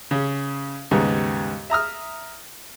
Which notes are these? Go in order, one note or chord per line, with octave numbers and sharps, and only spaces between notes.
C#3 C#4
D#2 G#2 C#3 G3 B3
E5 A#5 D#6 F6